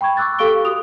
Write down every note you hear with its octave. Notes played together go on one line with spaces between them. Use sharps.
G5 B5 C#6 G#6
C#6 D6 E6 F#6 A6
G4 A4 F5 C#6 D7 G7
F#4 D#6 F7